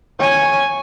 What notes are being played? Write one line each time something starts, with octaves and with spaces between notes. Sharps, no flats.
C#5 G#5